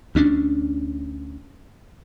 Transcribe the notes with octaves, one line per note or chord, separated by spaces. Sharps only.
D2 C#4 D4